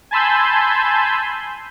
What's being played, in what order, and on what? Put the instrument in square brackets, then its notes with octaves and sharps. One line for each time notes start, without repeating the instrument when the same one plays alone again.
[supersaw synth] G#5 A5 B5 C6 E6 G6